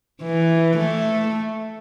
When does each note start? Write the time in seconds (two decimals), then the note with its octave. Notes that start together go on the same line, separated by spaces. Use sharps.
0.23 E3
0.77 A3